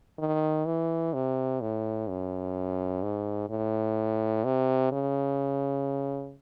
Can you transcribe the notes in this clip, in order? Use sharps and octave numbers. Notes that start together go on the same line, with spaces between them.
D#3
E3
C3
A2
F#2
G#2
A2
C3
C#3